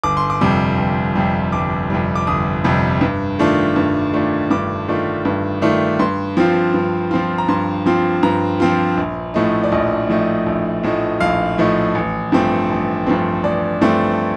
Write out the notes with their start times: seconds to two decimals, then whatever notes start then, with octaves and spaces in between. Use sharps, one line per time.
0.03 G1 D6
0.17 C6
0.30 D6
0.41 F2 C3 G3
0.78 G1
1.15 F2 C3 G3
1.52 G1 D6
1.90 F2 C3 G3
2.16 D6
2.27 G1 D#6
2.64 F2 C3 G3
3.01 G2
3.39 D#3 A3 D4 F4
3.76 G2
4.13 D#3 A3 D4 F4
4.50 G2 D6
4.88 D#3 A3 D4 F4
5.25 G2
5.62 D#3 A3 D4 F4
5.99 G2 C6
6.37 F3 C4 F4
6.74 G2
7.11 F3 C4 F4
7.38 A#5
7.49 G2 C6
7.86 F3 C4 F4
8.23 G2 A#5
8.60 F3 C4 F4
8.97 A#1
9.34 A2 F3 A3 D#4
9.64 D5
9.72 A#1 D#5
10.08 A2 F3 A3 D#4
10.46 A#1
10.83 A2 F3 A3 D#4
11.20 A#1 F5
11.58 A2 F3 A3 D#4
11.95 A1
12.32 G2 F3 A3 C4
12.69 A1
13.06 G2 F3 A3 C4
13.44 A1 D5
13.81 G2 F3 A3 C4